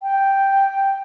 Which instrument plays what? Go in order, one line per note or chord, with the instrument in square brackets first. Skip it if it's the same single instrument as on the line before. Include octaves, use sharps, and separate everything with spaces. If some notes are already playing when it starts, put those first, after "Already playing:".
[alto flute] G5